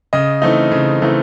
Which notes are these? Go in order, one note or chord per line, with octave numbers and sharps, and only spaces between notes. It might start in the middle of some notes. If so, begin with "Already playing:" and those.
C#3 D#5
E3 A3 C4 D#4
C#3
E3 A3 C4 D#4